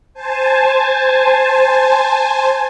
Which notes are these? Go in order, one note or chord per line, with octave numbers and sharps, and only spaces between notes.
C5 G#5 A5